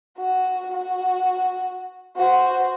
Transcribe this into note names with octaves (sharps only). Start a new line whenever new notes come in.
F#4
F#4
F#4 C5